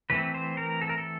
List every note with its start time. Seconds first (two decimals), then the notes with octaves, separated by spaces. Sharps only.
0.10 E3 A3 C4 B4
0.34 C5
0.57 A#4
0.81 A4
0.89 A#4
0.98 A4